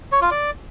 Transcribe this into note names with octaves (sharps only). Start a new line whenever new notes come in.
C#5
F4
D5